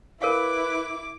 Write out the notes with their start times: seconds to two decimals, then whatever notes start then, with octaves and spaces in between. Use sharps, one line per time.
0.22 E4 A#4 B4 C#5 F5 D6